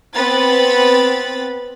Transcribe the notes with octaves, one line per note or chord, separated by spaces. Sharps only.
B3 C4 B4 B5 A6